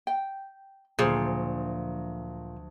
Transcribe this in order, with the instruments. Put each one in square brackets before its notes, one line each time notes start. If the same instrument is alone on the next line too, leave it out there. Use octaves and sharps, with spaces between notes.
[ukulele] G5
[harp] D2 F3 F#3 [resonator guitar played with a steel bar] A#2 [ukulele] G#4 C5